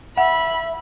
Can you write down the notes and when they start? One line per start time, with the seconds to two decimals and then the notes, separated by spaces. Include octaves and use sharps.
0.17 E5 F#5 B5